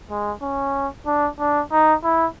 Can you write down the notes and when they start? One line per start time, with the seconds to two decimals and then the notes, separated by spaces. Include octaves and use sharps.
0.10 G#3
0.42 C#4
1.06 D4
1.40 D4
1.72 D#4
2.04 E4